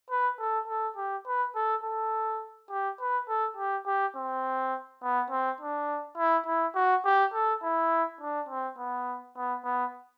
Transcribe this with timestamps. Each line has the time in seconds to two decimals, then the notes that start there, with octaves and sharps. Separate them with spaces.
0.10 B4
0.39 A4
0.68 A4
0.96 G4
1.26 B4
1.55 A4
1.84 A4
2.70 G4
3.00 B4
3.29 A4
3.57 G4
3.86 G4
4.16 C4
5.03 B3
5.30 C4
5.61 D4
6.17 E4
6.46 E4
6.75 F#4
7.05 G4
7.34 A4
7.63 E4
8.21 D4
8.49 C4
8.78 B3
9.36 B3
9.65 B3